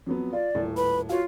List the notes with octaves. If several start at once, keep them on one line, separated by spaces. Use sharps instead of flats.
F2 F#3 B3
F4 D5
D#1 A2
B4 B5
F4 F#4 C#5 F5